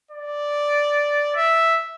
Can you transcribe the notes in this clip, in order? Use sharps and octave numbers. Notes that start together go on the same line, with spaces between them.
D5
E5